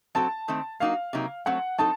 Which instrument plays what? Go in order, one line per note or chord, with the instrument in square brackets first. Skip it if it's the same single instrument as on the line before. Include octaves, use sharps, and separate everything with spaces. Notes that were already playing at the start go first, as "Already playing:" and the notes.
[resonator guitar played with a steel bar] F#3 C4 F#4 A4 [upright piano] A5
[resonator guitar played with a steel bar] D#3 A3 C4
[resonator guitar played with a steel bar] F#3 A#3 D#4 F#4 [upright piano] F5
[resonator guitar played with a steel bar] C3 F#3 A#3 D#4
[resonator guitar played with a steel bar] F#3 A3 C4 [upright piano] F#5
[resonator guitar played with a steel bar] F#3 C4 D#4 A4 [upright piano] A5